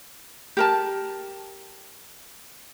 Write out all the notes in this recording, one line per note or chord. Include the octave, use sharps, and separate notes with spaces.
G4 A#4 A5